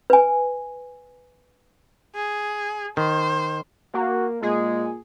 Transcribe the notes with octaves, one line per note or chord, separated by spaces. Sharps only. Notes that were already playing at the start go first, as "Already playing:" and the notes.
B4 G#5
G#4
D#3 C5
A#3 F#4
A#2 G#3 G#4